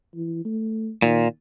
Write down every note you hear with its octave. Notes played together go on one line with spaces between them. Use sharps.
E3
A3
A#2 D#3